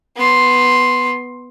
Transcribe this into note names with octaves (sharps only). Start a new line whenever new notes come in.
B3 C6